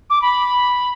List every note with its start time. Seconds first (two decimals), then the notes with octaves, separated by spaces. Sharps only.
0.10 D6
0.22 B5